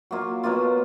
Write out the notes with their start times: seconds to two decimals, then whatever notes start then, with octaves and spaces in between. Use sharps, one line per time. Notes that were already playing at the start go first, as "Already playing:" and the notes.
0.11 F#3 A#3 F4
0.43 B2 F#3 A#3 F4